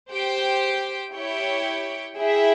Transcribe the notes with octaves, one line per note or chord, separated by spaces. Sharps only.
G4 C5 G5
E4 G4 C#5 G5
E4 G#4 E5 G5